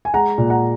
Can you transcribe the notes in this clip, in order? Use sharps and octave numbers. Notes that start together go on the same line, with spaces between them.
G#5
G#3 F#5 A#5
A#2
F#5 A#5